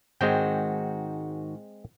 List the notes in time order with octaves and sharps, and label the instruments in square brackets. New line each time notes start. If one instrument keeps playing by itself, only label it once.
[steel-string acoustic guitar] G#2 D#3 F#4 [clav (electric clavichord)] G#3 C4 G5